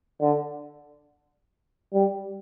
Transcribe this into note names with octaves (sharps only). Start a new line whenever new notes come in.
D3
G3